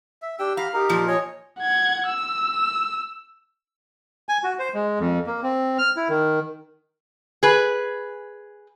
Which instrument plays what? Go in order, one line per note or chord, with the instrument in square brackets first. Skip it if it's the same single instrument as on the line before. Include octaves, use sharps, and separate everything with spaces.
[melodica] E5
[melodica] D4 G5 E6 [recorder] G4
[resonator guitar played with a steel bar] F5 [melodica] A#5 B5
[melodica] D#4 A#4 [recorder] G4
[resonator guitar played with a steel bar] A#2 F3
[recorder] C#5 [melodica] D#5 G#5
[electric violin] F#5 G#6
E6
[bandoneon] G#5
F#4
C5
G#3
F2
A#3
C4
F6
E4
D#3
[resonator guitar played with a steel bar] G#4 B4